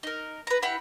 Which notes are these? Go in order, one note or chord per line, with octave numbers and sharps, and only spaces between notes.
D#4 A#4
B4 A#5
E4 G4 F#5 B5